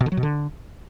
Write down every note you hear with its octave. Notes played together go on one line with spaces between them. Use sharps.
B2
D3
F#3
B2
D3